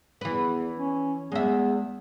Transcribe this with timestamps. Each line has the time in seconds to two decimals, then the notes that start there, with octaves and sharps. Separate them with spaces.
0.21 E2 E3 B4
0.77 C#4
1.32 E2 G#3 E5